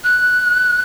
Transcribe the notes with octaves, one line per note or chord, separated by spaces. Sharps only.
F#6